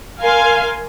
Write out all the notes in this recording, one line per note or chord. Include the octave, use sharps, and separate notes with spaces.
A#4 F5 G#5 C6